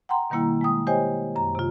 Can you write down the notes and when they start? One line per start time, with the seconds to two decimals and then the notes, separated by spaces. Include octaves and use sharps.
0.09 F#5 G5 A#5 C6
0.30 B2 D#3 G3 A#3 E4
0.61 G#3 G5 D#6
0.87 G4 C5 C#5 D#5 G5 G#5
1.36 F#2 A#5
1.55 C3 F4